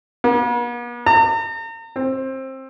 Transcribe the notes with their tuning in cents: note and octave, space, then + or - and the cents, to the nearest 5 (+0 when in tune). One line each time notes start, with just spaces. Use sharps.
B3 -45
A#5 -40
C4 +20